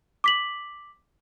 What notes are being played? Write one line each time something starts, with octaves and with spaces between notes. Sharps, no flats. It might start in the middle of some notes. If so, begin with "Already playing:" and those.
D6 B6 F#7